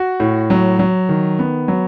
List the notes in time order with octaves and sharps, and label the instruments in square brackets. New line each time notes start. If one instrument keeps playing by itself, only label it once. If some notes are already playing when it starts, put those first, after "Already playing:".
Already playing: [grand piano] F#4
A2
F#3
F#3
D#3
B3
F#3